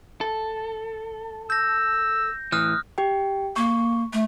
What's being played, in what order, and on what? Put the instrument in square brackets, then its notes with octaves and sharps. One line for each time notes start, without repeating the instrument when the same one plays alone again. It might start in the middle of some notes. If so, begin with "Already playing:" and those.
[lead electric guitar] A4
[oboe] E6 [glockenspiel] G6 A#6
[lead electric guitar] A2 E3 [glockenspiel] D#6 F6 F#6
[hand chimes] G4 G5
[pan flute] A#3 [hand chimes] C#6
[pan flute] A3